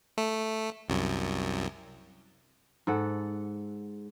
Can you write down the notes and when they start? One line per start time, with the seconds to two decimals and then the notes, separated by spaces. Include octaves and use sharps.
0.18 A3
0.89 C2 F#2
2.87 G#2 A4 F#5